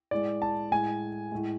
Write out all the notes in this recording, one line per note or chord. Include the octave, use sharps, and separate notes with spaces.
A2 G#3 D5
A5
A2 G#3 G#5
A2 G#3